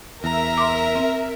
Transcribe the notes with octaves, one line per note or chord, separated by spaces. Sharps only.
E2 A#4 E5 A#5
C6 D6
C4